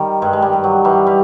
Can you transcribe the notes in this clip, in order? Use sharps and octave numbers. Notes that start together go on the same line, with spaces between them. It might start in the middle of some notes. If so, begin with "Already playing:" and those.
Already playing: D#3 G3
G2 G#3
G#3
G3
G2
F#3
E3 G3
G3